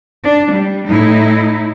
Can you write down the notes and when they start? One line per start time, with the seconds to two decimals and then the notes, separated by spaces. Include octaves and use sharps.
0.24 D4
0.53 G3
0.89 A2 D#4 E4